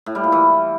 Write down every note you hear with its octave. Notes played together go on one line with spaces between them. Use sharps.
A2
G3
A#2
E3